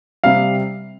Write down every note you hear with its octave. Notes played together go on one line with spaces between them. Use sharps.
C3 G3 F5